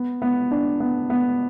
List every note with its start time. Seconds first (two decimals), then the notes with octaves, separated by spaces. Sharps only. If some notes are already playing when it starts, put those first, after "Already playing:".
Already playing: B3
0.22 B3
0.51 D4
0.80 B3
1.10 B3